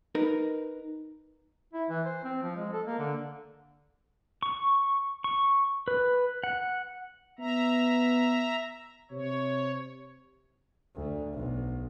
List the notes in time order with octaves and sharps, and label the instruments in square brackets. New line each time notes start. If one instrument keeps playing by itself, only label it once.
[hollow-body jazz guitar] D#4 A#4 B4
[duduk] E4
E3
C5
C4
F3
G#3
A4
A#3
D3
[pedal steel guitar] C#6
C#6
B4
F#5
[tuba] B3 [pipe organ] E5 A#5
[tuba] C3 [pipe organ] C#5
[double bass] D2
B1